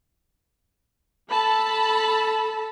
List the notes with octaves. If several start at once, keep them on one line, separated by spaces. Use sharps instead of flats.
A4 A5 B5